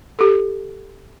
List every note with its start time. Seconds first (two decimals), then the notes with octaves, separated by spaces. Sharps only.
0.19 G4 A4